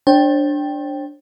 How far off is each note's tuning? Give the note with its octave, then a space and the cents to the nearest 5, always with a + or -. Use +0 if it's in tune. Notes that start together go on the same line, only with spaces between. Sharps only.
D4 +0 C5 +45 G5 +0